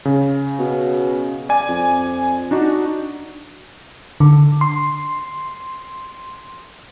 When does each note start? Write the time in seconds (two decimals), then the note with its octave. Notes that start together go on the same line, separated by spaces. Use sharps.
0.05 C#3
0.59 B2
1.49 D5 G#5
1.69 F2
2.51 D4 D#4 F#4
4.20 D3
4.61 C6